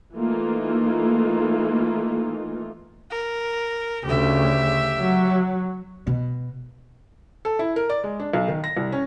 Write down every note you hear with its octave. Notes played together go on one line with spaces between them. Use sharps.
E3 A3 A#3 D#4 F4
A#4
D2 C#3 G4 E5
F#3
B2
A4
E4
A#4
D5
G#3
D4
B1
D#3
A#6
C2
C#4